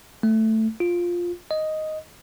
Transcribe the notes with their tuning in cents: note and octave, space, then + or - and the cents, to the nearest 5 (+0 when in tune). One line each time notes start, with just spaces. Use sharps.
A3 +5
F4 +5
D#5 +0